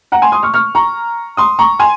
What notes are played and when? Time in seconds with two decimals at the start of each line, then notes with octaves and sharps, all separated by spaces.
0.12 F#5 A#5
0.22 G#5 C6
0.32 C6 D#6
0.43 C#6 F6
0.54 C#6 F6
0.75 A#5 C#6
1.37 C6 D#6
1.59 A#5 C#6
1.79 G#5 C6